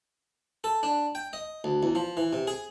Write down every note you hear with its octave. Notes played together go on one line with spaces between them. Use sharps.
A4
D4
G5
D#5
D2
E2
F3
E3
C3
G#4